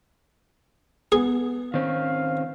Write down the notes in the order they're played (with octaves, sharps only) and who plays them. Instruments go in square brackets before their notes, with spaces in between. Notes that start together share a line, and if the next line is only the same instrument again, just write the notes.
[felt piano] B3 [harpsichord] G#4
[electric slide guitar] D#3 C4 C#4 [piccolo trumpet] F5